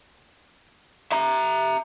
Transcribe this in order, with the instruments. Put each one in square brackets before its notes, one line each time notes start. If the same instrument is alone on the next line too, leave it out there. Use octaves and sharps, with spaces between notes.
[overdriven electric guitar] E5 A#5